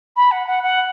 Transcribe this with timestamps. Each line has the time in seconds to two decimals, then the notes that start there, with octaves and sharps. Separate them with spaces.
0.16 B5
0.31 F#5
0.47 F#5
0.63 F#5